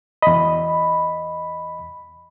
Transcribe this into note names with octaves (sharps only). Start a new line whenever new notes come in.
E2 D#5 B5